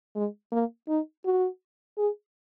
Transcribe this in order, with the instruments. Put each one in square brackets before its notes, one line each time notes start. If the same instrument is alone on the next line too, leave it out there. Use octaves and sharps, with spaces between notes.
[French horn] G#3
A#3
D#4
F#4
G#4